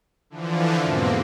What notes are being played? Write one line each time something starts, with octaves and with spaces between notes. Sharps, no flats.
D3 E3 F3
E2 G#2 B2 A#3 C4